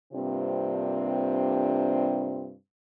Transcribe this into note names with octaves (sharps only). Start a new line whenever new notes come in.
G2 C3 A#3 C4 D4 F4